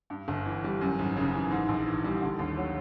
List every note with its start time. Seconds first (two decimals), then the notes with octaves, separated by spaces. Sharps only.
0.10 G2
0.28 G1
0.45 E3
0.64 G3
0.81 F#2
0.99 G#1
1.16 C#3
1.33 E3
1.51 G#2
1.68 A#1
1.86 E3
2.04 G3
2.22 D3
2.39 D#2
2.57 F#3